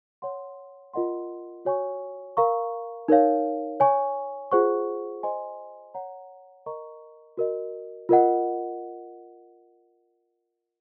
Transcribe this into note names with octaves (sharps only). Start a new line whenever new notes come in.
C#5 F#5 C6
F4 A#4 D#5 F#5 C6
F#4 C#5 G#5 C#6
A#4 F5 A#5 C#6
D#4 A#4 C#5 F5
C#5 G#5 C#6
F4 G#4 C5 F#5 C#6
C5 D#5 G#5 C6
C#5 F#5 A#5
A#4 D#5 A#5 C#6
F#4 A#4 D#5
F4 A#4 D#5 F#5